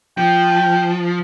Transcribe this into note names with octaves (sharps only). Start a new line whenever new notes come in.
F3 G5